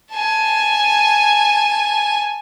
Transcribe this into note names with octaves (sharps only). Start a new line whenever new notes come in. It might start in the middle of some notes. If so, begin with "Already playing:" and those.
G#5 A5